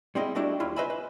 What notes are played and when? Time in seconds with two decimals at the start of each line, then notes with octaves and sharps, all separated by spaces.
0.15 G3 G#3 C4 E4 G#4 D#5
0.35 G3 A3 D4 E4 F#4 G4
0.60 D#2 E4 F4
0.76 B4 C5 D#5 E5 G#5 B5
0.90 B4